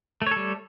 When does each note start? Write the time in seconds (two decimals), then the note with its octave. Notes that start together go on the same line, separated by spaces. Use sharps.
0.22 A3
0.27 C#5
0.31 A4
0.36 G3